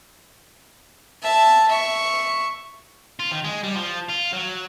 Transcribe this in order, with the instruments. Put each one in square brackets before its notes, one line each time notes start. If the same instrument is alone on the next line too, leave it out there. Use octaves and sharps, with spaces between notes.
[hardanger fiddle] E5 A5
E5 C#6
[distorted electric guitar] F4
D#3
G#3
G3
F3
F4
F#3